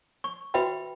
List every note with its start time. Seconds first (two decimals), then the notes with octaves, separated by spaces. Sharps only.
0.24 C#6
0.54 F#4 B4 E5 G5 B5